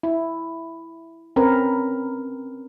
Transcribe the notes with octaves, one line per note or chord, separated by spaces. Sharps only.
E4
C4 C#4 A#4 B4